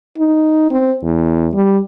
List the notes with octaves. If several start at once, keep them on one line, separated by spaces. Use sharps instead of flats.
D#4
C4
E2
G3